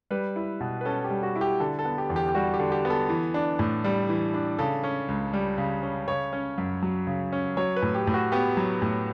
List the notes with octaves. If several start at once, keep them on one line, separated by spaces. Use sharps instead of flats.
G3 B4
E4
B2
B4
C#4 A4
G4
G3
F#4
E4
G4
D3 A4
A4
B3
G4
E2
G4
G4
G3 F#4
G4
D3
G4
B3
A4
E3
D4
A2
G3
E3
D4
C#3 A4
C#4
C#2
G3
C#3
C#4
C#3 C#5
C#4
F#2
F#3
C#3
C#4
F#3 C#5
B4
A2
G4
A2
F#4
B3 G4
F#3
A2